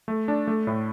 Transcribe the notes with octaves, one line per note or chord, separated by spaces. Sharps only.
A3
D4
A3
A2